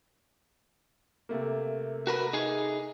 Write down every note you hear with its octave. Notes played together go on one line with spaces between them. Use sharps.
C3 A3 A#3
F#4 A#4 B4
D#4 G#4